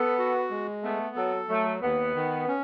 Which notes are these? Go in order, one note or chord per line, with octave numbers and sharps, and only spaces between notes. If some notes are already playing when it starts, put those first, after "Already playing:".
Already playing: B3 A4
F#4
G#3
A3 B3
F#3 A4
F#3 A3
D#2 B3
D#3
C#4